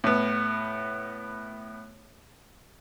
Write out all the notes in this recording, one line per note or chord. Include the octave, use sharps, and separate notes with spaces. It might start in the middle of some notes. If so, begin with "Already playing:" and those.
A2 B3